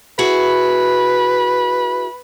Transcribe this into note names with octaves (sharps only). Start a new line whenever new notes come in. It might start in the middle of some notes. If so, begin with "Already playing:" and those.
E4 F#4 G#4 B4